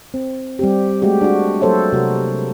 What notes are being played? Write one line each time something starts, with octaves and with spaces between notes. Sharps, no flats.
C4
G3 C4 G4
G#3 A3 F#4 G4
D4 F#4
F#3 A#3 A4 C5 C#5 E5
C3 F#4 A#4